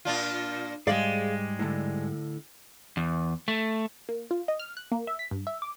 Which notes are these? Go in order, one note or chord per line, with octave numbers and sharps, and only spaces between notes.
A#2 D4 F4
G#2 G3 G#3 G#4 D5 F5
A2 D3
E2
A3
A#3
F4
D#5
F6
F#6
A#3
E5
B6
G2
E5
D6